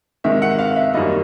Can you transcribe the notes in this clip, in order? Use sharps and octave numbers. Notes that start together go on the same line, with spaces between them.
C3 D#3 G#3 E5
F#5
F5
E5
F#2 D#3 G3 A#3 D#5